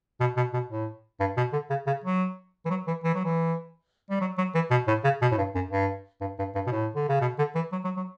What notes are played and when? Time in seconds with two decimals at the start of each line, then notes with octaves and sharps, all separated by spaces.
0.20 B2
0.37 B2
0.53 B2
0.70 A2
1.20 G2
1.37 B2
1.53 D3
1.70 C#3
1.87 C#3
2.04 F#3
2.65 E3
2.70 F#3
2.87 E3
3.04 E3
3.14 F#3
3.24 E3
4.10 G3
4.21 F#3
4.38 F#3
4.55 E3
4.71 B2
4.88 A2
5.04 C#3
5.22 B2
5.31 A2
5.38 G2
5.55 F#2
5.71 G2
6.21 G2
6.39 G2
6.55 G2
6.67 B2
6.72 A2
6.95 D3
7.09 C#3
7.21 B2
7.39 D3
7.55 E3
7.72 F#3
7.84 F#3
7.97 F#3